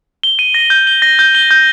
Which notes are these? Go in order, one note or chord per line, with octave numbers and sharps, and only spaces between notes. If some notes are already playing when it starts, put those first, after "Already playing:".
G7
D#7
A#6
G6
G7
A#6
G6
G7
G6